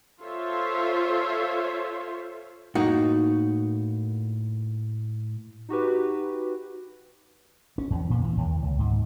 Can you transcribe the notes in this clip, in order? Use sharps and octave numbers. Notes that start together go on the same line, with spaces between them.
F4 A4 C5 C#5 E5
A2 A#3 D#4 F#4
D#4 F#4 G4 B4
C#4
E2
A#2
E3
D#2
C#2
G#2